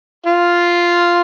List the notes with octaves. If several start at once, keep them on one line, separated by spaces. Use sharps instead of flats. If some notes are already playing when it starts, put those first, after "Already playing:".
F4